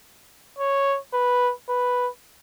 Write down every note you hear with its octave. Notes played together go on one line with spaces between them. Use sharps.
C#5
B4
B4